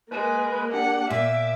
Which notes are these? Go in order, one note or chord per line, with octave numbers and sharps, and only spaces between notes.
G#3 A#3 B4
D4 G4 F#5
A#2 E5 D6